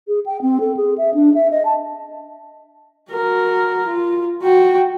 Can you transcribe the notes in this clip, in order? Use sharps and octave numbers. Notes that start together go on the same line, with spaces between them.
G#4
G5
C4
A4
G#4
E5
D4
E5
D#5
A5
F#4 A#4
F4
F#4 G5